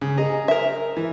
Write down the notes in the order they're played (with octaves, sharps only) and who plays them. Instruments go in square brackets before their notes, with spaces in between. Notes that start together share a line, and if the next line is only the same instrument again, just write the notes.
[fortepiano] C#3
G#4 D#5 A#5
[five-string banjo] A#4 E5
[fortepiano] E3